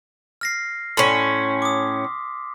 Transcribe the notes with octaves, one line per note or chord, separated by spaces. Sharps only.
F6 A#6 C7
A2 C#4 C6 B6
D6 D#6